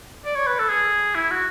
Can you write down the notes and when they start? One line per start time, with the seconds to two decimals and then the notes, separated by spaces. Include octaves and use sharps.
0.25 D5
0.36 C#5
0.47 B4
0.59 A4
0.70 G#4
1.15 E4
1.31 F#4